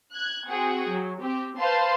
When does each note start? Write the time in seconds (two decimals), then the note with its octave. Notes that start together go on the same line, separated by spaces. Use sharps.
0.14 F#6 G#6
0.47 C4 F#4 G#4 F#5 G5
0.88 F#3
1.21 C4 G4
1.59 B4 C5 F5 A5 C6